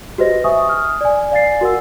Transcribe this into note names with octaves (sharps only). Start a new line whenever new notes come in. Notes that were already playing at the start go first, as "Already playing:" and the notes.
F#4 G4 B4 C5 D#5 A#6
E5 G#5 C#6 D#6
D#6 F6
D5 G#5
D5 F5 G#5 A6 C7
F#4 A#4 F#5 E6